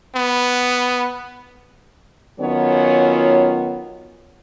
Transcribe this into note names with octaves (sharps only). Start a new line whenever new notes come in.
B3
D#3 F#3 B3 C#4 F4 C#5